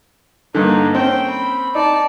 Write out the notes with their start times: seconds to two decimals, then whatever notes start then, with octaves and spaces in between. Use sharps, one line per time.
0.55 G2 D3 A#3 D#4
0.95 C4 C#4 G5
1.30 B5
1.75 D#4 D5 A5